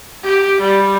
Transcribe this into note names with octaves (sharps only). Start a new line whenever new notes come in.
G4
G3